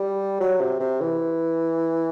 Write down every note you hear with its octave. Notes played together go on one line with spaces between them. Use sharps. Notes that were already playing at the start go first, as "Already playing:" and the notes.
Already playing: G3
F#3
C3
C3
E3